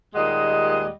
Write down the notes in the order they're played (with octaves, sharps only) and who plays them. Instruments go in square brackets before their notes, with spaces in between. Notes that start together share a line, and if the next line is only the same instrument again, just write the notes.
[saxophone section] D#2 A#2 G3 G#3 D#5 F#5